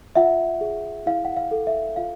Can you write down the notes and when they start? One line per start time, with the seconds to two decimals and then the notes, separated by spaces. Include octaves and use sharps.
0.15 F4 E5 F#5
0.61 G#4
1.06 E4 F5
1.25 F#5
1.37 F5
1.51 A4
1.67 E5
1.96 F4 F5